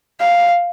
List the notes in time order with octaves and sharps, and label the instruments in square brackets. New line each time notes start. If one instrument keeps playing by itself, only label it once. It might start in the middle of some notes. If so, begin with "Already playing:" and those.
[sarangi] F5